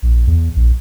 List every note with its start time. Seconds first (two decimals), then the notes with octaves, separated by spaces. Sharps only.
0.02 A#1
0.27 E2
0.56 A#1